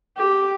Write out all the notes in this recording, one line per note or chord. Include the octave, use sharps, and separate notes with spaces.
G4